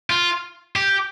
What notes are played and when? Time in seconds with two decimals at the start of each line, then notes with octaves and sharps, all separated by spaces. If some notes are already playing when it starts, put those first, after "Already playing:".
0.10 F4
0.76 G4